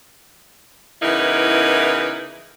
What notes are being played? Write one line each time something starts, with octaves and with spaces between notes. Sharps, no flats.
C#3 E3 B3 D#4 E4 A#4